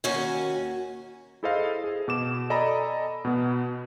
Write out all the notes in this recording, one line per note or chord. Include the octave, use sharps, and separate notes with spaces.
D#2 A#3 C#4 F#4 G#5
E4 G#4 A4 C5 D#5 F5
G#4
B2 D6 E7
A4 D5 D#5 G#5 A#5 B5
B2 B3